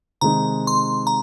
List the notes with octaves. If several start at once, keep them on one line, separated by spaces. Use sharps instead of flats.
C3 D#3 G#3 D#4 A#5
C6
A#5